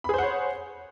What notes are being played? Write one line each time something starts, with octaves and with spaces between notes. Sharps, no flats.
G#4 C5 C#5 F#5 B5